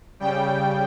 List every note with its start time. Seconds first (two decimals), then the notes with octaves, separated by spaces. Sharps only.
0.20 C#3 G3 G5